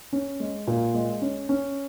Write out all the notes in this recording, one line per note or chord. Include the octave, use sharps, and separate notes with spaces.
C#4
G#3
A#2
G#3
C#4
C#4